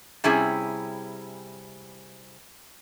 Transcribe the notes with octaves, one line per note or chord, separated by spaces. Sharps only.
C3 G3 C#4 E4 G#4